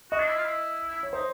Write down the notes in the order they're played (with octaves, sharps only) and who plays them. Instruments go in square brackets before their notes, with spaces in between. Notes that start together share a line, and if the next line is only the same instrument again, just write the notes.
[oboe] F#4 [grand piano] D#5
[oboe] D4
E4
F4
E4
[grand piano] C#5
[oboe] D#4 [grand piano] C5